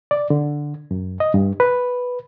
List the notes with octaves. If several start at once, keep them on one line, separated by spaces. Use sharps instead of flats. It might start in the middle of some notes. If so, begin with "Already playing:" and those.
D5
D3
F#2
D#5
G2
B4